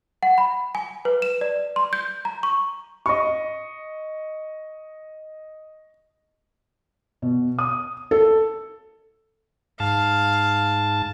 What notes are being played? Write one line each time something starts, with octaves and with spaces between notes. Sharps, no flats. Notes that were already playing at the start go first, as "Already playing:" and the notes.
F#5
B5
G#5
B4
E7
D5
C6
G6
A#5
C#6
D#5 C#6
B2
D#6
A4
G#2 F5 A5